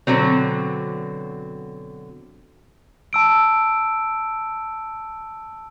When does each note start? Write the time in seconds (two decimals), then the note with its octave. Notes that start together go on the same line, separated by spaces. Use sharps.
0.07 B2 D3 F#3 C4
3.13 A5 E6 D7